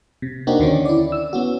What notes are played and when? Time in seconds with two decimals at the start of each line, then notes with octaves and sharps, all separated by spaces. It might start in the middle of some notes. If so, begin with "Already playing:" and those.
0.22 C3
0.47 A#3 C4 D4 D#4 F#4 G4
0.59 D#2 D3 D#3 C4 C#4
0.85 E4 D5
1.12 E6
1.33 B3 C#4 F#4